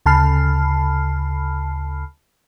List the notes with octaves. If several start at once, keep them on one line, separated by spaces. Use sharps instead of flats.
D2 C#3 A5 B5 F6 C7